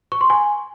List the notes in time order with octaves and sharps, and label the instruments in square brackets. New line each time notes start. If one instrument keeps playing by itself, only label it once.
[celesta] C#6
C6
G#5